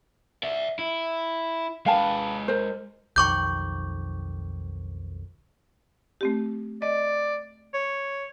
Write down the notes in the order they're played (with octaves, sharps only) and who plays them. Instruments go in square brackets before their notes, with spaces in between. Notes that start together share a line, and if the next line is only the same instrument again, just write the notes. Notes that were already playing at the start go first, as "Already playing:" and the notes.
[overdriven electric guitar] D5 E5
E4
[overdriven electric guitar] G#3 B4 [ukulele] F5 G5 A5
[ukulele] A#4 C5
[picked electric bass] B1 F2 D#3 [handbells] C#6 D6 G6
[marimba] A3 C4 G4
[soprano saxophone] D5 [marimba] D#5
[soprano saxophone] C#5